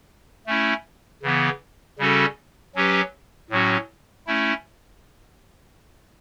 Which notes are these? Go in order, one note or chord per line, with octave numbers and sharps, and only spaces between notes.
A3 C#4 E4
C#3 E3 B3
C#3 G3 C#4 F#4 A4
F#3 C#4 G4 B4
A2 F#3 C#4 F#4
A3 C#4 E4